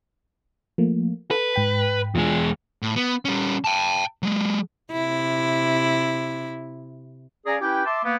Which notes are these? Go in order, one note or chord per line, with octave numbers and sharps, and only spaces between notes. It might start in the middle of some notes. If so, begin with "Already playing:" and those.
F3 A3 A#3
A4 B4
G#2 G5 B6
E2 G#3 F4
A2
B3
G3 C#4
G5 A5
F#3 G#3
C3 E4
C#4 G#4 D5 F5 G#5 A#5
C#4 E4 G4 B4 G5
E5 A5 C6 D6
A#3 B3